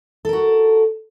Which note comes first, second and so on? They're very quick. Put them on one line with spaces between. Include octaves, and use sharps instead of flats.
A4 A#4 F#4